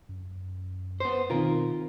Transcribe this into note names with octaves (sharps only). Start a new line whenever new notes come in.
F#2
B3 C5
B2 D#3 C4 D#4 F4 A#4